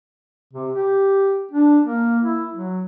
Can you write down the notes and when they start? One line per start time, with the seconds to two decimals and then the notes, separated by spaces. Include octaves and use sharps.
0.53 C3
0.73 G4
1.51 D4
1.82 A#3
2.22 E4
2.53 F#3